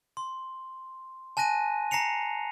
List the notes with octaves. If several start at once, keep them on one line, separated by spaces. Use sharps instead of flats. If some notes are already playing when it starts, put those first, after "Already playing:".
C6
G#5 A5 F#6 A#6 D#7
A#5 A#6 C7 C#7 F7